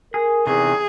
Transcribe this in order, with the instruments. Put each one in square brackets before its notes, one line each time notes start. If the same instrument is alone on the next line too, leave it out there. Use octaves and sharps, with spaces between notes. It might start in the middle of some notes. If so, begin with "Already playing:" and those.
[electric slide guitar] G#4 [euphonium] A#4
[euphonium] E2 [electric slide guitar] C3 D#3 E3 [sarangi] G#4